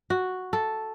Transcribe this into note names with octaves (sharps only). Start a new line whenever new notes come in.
F#4
A4